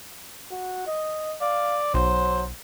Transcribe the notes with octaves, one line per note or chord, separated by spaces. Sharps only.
F#4
D#5
D5 F5
B1 F#3 C5